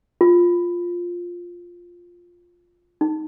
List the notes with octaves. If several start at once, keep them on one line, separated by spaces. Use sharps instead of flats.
F4
D#4